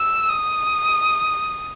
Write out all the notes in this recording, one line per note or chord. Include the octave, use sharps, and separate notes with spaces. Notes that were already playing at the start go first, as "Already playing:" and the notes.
Already playing: E6
D#6